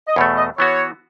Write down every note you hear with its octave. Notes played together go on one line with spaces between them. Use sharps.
D#5
E2 B2 A3 C#5
D#5
E3 B3 F#4 C#5